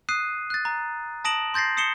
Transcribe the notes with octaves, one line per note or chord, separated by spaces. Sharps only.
D#6 F#6 C7 D#7
F#6 A6
A#5
A5 D#6 A#6 D7 E7 F#7
C6 G6 A6 A#6 C7
D#6 C7 C#7 E7 G7